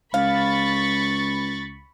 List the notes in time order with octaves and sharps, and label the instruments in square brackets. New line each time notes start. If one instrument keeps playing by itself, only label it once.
[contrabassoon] C#2 [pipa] F5 [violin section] B5 C#6 A6